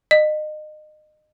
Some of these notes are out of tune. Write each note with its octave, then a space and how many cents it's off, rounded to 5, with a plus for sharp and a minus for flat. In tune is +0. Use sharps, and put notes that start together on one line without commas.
D#5 -30